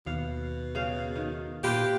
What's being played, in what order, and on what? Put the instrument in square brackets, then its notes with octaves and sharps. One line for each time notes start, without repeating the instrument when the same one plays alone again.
[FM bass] D#2 [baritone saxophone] B2 [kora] F5
[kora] C#3 F5
D#3
[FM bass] A#2 [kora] F4 B4 C5 [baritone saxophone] G4